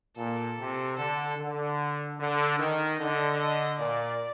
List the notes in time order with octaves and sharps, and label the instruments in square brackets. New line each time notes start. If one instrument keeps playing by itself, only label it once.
[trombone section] A#2 [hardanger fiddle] A4
[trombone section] C3
[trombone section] D3 [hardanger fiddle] A4
[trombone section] D3
D3
D#3
[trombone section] D3 [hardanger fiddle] D#5
[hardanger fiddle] D#5
[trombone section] A#2 [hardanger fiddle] D5